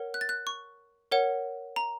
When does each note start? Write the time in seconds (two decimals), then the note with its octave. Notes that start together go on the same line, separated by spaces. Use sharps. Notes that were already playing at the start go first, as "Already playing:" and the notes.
Already playing: A#4 C#5 F#5
0.14 F#6
0.21 A6
0.29 F#6
0.47 C#6
1.12 A#4 C#5 F#5
1.76 A#5